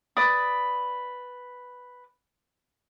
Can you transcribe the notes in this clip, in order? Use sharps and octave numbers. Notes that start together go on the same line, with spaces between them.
B4 D5 D#6